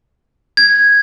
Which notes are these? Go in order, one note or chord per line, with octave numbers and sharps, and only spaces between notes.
G#6